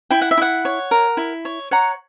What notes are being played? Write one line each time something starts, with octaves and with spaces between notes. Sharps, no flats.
E4 G5
F#5
E5
E4 F#5
C#5
A#4
E4
C#5
C#5 F#5 A#5